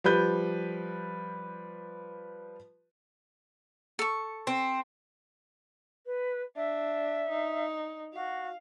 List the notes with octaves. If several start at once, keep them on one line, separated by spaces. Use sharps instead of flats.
F3 G3 B4 G6
A4 C#6
C4
B4
D4 E5
D#4
F#4 F5